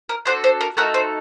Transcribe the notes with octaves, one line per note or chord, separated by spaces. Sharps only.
A#4
D4 F#4 A4 C5
C5
A#4
A3 D#4 F#4 A4 A#4
C5